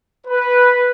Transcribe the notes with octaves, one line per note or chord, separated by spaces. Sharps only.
B4